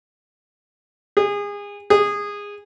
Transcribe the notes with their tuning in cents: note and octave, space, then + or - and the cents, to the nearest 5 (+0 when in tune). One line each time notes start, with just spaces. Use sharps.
G#4 -30
G#4 -20